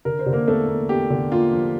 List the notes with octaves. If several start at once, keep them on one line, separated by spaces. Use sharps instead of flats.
D3 A#4
C5
D3
A#3 A#4
E2 A3 A4
A#3
E2 G4
D3
A#3 F4
F3